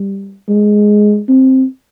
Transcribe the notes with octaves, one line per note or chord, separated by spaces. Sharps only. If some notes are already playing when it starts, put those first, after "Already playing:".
Already playing: G3
G#3
C4